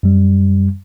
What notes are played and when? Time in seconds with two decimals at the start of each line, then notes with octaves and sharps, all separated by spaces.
0.03 F#2 G3